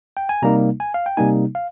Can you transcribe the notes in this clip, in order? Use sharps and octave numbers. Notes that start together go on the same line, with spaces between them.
G5
G#5
C3 G3 A#3 D#4 A#5
G#5
F5
G5
C3 G3 A#3 D#4 G#5
F5